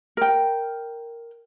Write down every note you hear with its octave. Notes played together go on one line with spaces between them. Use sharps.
A#4 G5